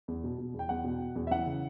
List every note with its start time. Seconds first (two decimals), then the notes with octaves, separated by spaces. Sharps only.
0.08 E2
0.24 B2
0.38 B2
0.54 E2
0.59 G5
0.69 E2 F#5
0.84 B2
1.00 B2
1.16 E2
1.27 E5
1.31 E3 F#5
1.46 C#3